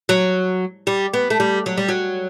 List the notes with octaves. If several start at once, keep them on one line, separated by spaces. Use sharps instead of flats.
F#3
G3
B3
A3
G3
F#3
G3
F#3